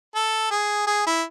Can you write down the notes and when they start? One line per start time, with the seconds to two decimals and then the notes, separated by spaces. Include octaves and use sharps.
0.15 A4
0.51 G#4
0.87 G#4
1.06 E4